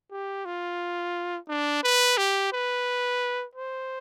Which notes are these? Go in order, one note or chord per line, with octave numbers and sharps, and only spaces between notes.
G4
F4
D4
B4
G4
B4
C5